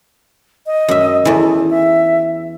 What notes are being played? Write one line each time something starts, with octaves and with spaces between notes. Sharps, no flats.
D#5
F#2 E5
E2 E3 A4
E5